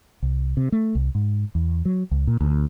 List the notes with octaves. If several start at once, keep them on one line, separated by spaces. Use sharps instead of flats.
C2
C3
A3
C2
G#2
E2
F#3
C#2
A#2
D2